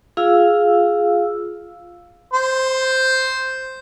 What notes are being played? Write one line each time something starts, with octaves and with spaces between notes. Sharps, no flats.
F4 G#4 F5 E6
C5